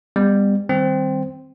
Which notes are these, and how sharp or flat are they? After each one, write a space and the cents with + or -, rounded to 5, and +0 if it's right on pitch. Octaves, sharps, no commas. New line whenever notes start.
G3 +30 B3 +15
D#3 +0 G3 +0 C4 +0